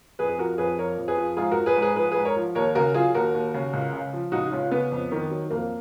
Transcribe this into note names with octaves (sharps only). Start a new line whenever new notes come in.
F2 G#4 B4
G#4
F3 F#4 A#4
F2 G#4 B4
F3 A#4 C#5
F2
G#4 B4
F3
G#2 F4 G#4
F#4 A#4
F3
G#4 B4
G#2
G#4 B4
F3 G#4 B4
G#2 G#4 B4
A#4 C#5
F3
D#2 A#4 C#5
C#3 F#4 A#4
F#3 F4 G#4
D#2 F#4 A#4
D#2
C#3
C#2
C#3
F3
C#2 D#4 F#4
C#2 C#4 F4
C#3 B3
F2
D#3
F#3
F2 A#3